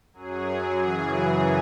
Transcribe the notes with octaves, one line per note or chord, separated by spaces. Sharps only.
F#2 F#3 G#4
F#2 C#3 E3 G#4